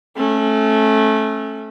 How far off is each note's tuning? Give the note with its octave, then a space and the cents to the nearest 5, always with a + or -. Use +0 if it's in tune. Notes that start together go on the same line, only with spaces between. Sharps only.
A3 -15 C#4 -30